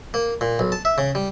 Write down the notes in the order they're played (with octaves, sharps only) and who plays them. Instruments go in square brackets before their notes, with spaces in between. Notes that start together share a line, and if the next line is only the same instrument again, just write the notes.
[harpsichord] A#3
A#2
B1
A5
E5
C#3
G3